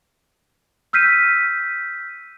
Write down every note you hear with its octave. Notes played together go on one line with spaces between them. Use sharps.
E6 F6 G6 B6 C7 D#7